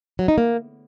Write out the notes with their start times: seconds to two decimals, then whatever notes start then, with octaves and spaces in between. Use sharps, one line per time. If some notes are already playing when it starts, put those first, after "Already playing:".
0.19 F#3
0.28 D#4
0.38 A#3